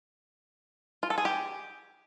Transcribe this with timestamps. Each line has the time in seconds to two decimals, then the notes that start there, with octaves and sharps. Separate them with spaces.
1.03 F4
1.10 A4
1.18 G#4
1.25 G4